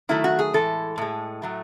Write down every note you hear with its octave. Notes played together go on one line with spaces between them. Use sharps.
D#3 F#3 A3 E4
F#4
G#4
A2 E3 G#3 A4
A2 G#3
A2 F#3 A3